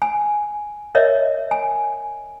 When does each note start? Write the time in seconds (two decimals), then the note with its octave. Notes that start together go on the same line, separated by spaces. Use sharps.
0.02 G#5
0.95 A#4 C#5 D#5 E5
1.51 G#5